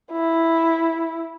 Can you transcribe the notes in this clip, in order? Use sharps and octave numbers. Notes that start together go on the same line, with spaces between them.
E4